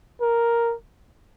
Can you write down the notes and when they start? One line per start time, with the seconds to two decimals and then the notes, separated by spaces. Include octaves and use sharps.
0.22 A#4